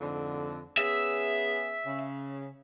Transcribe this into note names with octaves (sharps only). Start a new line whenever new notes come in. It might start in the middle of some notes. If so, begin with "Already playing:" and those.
F2 G#2 D3
B3 C#4 G#4 E5
C#3